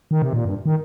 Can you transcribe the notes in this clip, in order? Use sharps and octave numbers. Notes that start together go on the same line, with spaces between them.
D#3
C3
A#2
G2
D#3